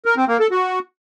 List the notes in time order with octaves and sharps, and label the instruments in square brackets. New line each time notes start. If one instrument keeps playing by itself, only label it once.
[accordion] A#4
C4
A#3
A4
F#4